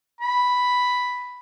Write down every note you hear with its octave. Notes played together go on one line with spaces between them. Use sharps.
B5